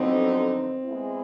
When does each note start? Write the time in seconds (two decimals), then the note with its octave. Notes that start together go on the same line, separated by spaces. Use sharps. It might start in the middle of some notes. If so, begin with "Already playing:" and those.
Already playing: F2 D3 F#3 B3 C4 D#4
0.86 G#3 B3 E4